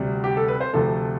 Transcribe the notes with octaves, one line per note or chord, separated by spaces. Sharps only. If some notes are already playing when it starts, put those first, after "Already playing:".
Already playing: D2 C3 G3
G4
A4
B4
C5
D2 C3 F3 A3 A4